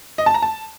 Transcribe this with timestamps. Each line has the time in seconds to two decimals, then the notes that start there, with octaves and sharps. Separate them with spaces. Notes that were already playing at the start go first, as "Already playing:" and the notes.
0.18 D#5
0.26 A5
0.34 A#5
0.42 A5